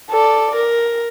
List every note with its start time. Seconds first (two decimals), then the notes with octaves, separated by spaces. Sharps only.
0.11 A4 D5
0.55 A#4